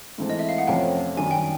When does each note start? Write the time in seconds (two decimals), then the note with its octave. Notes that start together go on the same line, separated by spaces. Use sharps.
0.18 G#2 E3 A3 C4
0.30 D#5
0.39 E5
0.49 F5
0.58 F#5
0.67 F2 C3 F3 A3 C#4 F5 G5
1.17 F#2 D#3 G3 G#5
1.31 G5